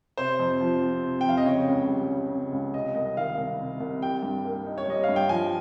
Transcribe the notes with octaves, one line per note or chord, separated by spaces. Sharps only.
C3 C5
F2
F3
C4
C3
G5
F2 F5
D#5
C#3 C#5
C#2
G3
C#4
C#3
C#2
C3 D#5
C2 D#5
D#3 F5
C2
C3
C2
G3 G5
G2
A#3
D#4
C#5
G3 D#5
F5
G2
G5
F3 G#5